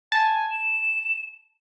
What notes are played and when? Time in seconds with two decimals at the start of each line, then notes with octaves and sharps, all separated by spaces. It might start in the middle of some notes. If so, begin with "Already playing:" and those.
0.12 G#5 A5
0.50 E7